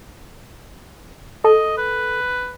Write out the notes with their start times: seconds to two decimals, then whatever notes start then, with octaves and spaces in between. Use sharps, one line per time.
1.44 A4 D#5
1.78 B4